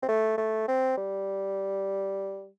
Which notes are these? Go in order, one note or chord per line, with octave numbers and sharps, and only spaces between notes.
C4
A3
A3
C4
G3